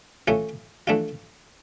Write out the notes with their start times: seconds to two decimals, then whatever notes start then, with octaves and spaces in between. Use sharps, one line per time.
0.28 E3 A3 C#4 F4
0.87 E3 A3 D4 F4